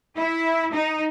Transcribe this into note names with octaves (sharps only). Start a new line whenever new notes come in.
E4
D#4